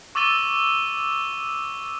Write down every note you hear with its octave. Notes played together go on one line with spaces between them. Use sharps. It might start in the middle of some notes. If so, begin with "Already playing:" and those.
C#6 D6 E6 A6 D#7 G7